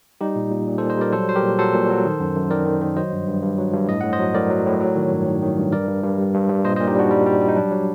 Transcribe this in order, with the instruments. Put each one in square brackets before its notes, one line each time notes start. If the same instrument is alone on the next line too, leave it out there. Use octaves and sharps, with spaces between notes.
[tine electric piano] G3 D#4 G4
A#2
A#2
A#2
A4 C5
A#2
C5 D#5
G3 A#4 D5
F#3 A4 C5
F#3 C5
G4 A#4
A#2
F#3 A4 C5
A#2
F#3
D#3
F#2
F#2
D#3 A#4 D5
D#3
D#3
F#3 C5 D#5
G2
G2
G2
F#3
G2
A2 D#5
A2 F#5
C5 D#5
F#3
A2 A#4 D5
F#3
A2
F#3
D#3
G2
D#3
D#3
G2
G2 A#4 D5
G2
G2
G3
G2
G2
A#2 C5 D#5
C5 D#5
A#2
D#4 G4
G3 D4 F#4
G3
G3
G3
D#4
F#3 D4
F#3